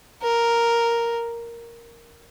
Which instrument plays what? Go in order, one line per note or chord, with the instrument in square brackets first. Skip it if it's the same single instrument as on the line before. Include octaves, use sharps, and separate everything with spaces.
[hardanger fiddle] A#4